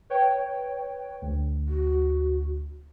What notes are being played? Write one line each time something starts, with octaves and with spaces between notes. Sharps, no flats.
B4 C#5 G5
D2
F#4